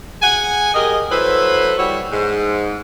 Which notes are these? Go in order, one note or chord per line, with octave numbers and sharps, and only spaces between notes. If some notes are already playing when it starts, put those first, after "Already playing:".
G#4 F#5 G#5
G4 G#4 A#4 D#5
F#3 E4 A4 B4 C5
G3 E4 F#4 C#5
G#2